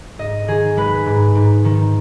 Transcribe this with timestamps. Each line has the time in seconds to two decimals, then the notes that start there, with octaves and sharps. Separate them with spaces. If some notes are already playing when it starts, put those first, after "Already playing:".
0.19 G#2 D#5
0.48 D#3 G#4
0.77 G#3 B4
1.06 G#2
1.35 G#2
1.65 D#3